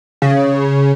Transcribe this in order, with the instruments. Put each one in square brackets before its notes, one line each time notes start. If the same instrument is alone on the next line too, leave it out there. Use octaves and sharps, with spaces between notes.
[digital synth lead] C#3